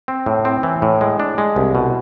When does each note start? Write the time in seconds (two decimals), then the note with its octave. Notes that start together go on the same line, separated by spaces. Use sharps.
0.08 C4
0.26 A2
0.45 C4
0.63 E3
0.82 A2
1.01 G#3
1.20 D4
1.38 G#3
1.56 C2
1.75 B2